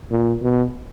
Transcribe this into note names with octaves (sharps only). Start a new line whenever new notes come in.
A#2
B2